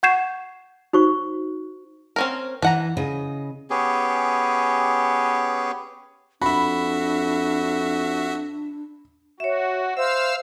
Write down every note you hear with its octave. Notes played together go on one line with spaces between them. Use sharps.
F#5 C#6 G6 G#6 C7 E7
D#4 F#4 C5 C#6
C4 C#4 A#4
E3 D4 F#5 A#5
C#3 D#5
B3 C#4 G4 G#4
F2 D4 F#4 E5 B5
F#4 C#5 E5
C5 E5 F5 E6